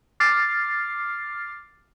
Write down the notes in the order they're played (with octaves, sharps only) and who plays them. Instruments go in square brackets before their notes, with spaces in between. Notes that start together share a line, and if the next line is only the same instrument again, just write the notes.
[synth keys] D6 F6 A6 C7